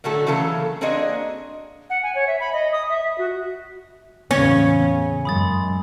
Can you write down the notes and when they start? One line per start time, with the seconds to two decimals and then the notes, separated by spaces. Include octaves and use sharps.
0.04 A2 D3 F#3 A3 F#4 A4
0.27 C#3 E3 F#3 A#3 A4
0.81 A#3 C4 D4 F#4 G#4 D#5
1.90 F#5
2.03 G#5
2.15 C#5
2.27 E5
2.40 B5
2.53 D#5
2.72 D#6
2.89 E5
3.04 E5
3.18 F#4
4.31 E2 A2 C#3 C#4 G#5 C#6
5.25 F#2 G#3 B5 D#6 A6